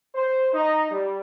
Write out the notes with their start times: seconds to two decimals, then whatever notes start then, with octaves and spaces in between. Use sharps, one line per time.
0.15 C5
0.53 D#4
0.92 G3